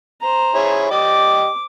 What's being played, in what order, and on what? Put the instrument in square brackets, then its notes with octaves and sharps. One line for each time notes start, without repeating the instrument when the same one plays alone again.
[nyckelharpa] C5 A#5
[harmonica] E4 G#4 C#5
[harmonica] G4 D5 D#5 [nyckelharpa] D6